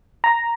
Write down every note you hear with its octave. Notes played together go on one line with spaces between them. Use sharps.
A#5